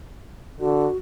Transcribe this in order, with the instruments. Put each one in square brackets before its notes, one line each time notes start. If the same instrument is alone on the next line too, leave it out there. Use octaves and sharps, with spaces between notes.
[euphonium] D3 [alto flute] F#4